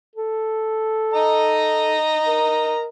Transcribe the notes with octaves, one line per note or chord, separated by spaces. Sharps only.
A4
D#5 A#5
A#4